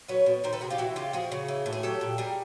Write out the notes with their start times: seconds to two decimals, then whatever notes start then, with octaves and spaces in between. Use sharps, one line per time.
0.08 F#3 B4 C#5
0.26 B2
0.44 D#3 A#4 C5
0.53 A4 B4
0.61 C3 F#4 G#4
0.70 F4 G4
0.78 E3 E4 F#4
0.96 C#3 F4 G4
1.13 F3 F#4 G#4
1.32 C#3
1.48 E3
1.66 A2
1.73 G#4
1.83 F#3 G4 A4
2.01 A#2
2.18 G3 G#4 A#4